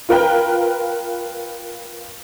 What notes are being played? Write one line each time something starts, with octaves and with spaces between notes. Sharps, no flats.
F4 A#4 B4 G5